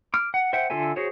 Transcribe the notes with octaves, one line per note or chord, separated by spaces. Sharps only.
D6 F6
F#5
C5 E5 F#5 G5
D3 F4 A4 E5 G#5
F#4 G#4 C5 C#5